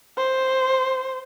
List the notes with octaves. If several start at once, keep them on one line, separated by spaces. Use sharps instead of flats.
C5